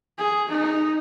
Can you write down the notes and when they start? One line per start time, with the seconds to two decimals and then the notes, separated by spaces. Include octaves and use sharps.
0.18 G#4
0.49 D#4